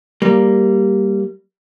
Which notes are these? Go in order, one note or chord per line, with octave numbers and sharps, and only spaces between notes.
G3 A#3